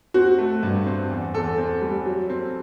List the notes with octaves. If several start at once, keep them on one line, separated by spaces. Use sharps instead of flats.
C4 F#4
A3
G2
C4
E2
E2 A4
C4
G3
F#3
C4